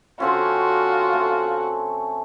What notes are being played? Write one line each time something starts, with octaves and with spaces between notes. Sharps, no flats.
D3 C4 C#4 F4 F#4
A3